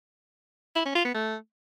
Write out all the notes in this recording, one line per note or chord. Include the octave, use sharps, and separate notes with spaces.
E4
C#4
F4
B3
A3